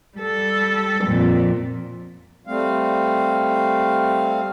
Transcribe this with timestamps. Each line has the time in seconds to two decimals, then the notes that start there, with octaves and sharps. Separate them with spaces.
0.18 G3 A4
1.04 F2 A#2
2.47 G3 A3 C4 F5